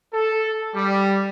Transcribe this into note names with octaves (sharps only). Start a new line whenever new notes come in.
A4
G3